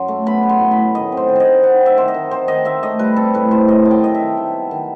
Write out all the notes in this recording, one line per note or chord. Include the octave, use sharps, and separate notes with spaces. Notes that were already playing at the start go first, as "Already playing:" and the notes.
Already playing: F#2 F#3 C6
A3
B3 B5
B3
C6
A2
B5
A2
D#3 D#5
C4
C5
D#3
C5 D#5
D#3
C4 F#5
C4
E5
D#3 C5
D#5
D#3
C4 C5
D#3 D#5
D#3 E5
A3 D#5
G3 B4
C4 A4
A2 B4
A2 C5
F#3 D#5
D#3 A5
G5
D#3 D#5
E5
D#3
D#3
B3
D#3